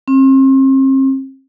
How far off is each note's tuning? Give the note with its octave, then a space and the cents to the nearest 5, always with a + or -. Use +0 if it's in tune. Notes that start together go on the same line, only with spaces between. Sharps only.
C4 +40